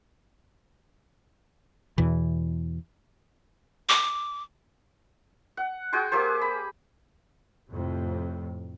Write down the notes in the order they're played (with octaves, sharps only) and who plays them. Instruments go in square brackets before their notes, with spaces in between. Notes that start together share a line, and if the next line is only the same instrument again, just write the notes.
[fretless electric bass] E2 B2 E3
[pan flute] D6
[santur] F#5
F#4 G#4 G5 C6
A#3 G4 G#4 C5
B5
[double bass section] F2 A2 C3